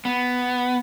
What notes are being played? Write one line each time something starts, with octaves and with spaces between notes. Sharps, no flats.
B3